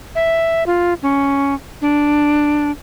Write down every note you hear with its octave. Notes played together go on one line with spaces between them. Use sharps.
E5
F4
C#4
D4